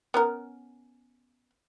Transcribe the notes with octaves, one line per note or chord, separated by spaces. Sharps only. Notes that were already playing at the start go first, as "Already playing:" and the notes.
B3 C#4 A#4